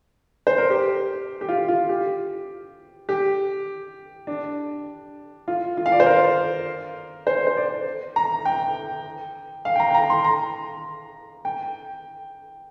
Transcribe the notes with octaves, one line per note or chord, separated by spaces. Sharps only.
C5
A#4
G4
G4
F4
F4
G4
G4
D4
F4
F4
F5
D5
C5
A#4
C5
C5
D5
A#5
G5
F5
G5
A#5
G5
A#5
C6
A#5
G5